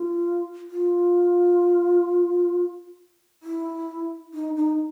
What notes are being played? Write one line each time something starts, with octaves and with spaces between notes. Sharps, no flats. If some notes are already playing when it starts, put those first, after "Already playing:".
Already playing: F4
F4
E4
D#4
D#4